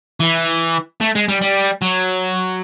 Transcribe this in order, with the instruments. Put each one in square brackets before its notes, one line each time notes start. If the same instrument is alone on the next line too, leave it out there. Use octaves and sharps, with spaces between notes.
[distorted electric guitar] E3
A3
G#3
G3
G3
F#3